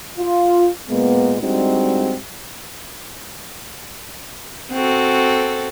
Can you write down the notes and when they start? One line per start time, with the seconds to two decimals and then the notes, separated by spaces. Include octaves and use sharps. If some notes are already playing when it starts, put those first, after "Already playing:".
0.19 F4
0.90 A#2 G#3 A#3 B3
1.41 G3 G#3 C4 D4 D#4 F#4
4.71 C4 F#4 A4